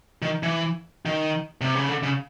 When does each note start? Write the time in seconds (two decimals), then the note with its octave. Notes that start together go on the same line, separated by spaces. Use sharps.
0.22 D#3
0.43 E3
1.06 D#3
1.61 C3
1.75 C#3
1.89 D3
2.03 C#3